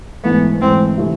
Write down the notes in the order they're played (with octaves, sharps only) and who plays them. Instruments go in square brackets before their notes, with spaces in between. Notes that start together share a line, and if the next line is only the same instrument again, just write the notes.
[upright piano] G#2 E3 A3 [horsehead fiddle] B3
[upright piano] G#2 E3 A3 [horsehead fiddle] C4
[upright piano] C3 E3 A3 E4